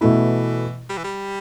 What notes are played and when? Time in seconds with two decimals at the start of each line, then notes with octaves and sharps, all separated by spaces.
0.01 B2 E3 A3 E4
0.89 G3
0.97 E3
1.04 G3